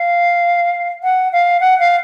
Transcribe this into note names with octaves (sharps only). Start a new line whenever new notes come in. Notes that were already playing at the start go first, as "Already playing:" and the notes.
Already playing: F5
F#5
F5
F#5
F5